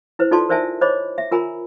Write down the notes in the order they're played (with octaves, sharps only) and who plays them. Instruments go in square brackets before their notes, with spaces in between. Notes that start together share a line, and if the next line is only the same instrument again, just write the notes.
[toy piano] E4 B4 C5
D#4 F4 A4 D5 A5 C6
A#4 C5 D5 E5 G#5 A5
C5 C#5 D#5 B5 D6
E5
F4 A#4 G#5 A#5 B5